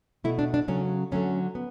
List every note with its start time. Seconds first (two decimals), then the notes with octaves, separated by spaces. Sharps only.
0.24 B2 A3 E4
0.39 D4
0.54 D4
0.68 C#3 F#3 A3 C#4
1.12 D3 F#3 A3 C#4
1.55 B3